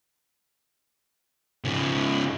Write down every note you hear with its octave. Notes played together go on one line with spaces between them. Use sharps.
G#2 C#3